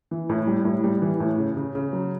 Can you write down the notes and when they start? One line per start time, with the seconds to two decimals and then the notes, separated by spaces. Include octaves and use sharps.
0.11 E3
0.30 A2
0.47 G3
0.65 A2
0.84 G3
1.01 E3
1.20 A2
1.38 C#3
1.57 C#3
1.75 C#3
1.93 F#3